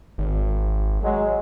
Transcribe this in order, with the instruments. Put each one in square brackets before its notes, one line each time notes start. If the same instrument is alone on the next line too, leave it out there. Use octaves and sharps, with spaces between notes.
[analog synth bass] G#1
[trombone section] F#3 G#3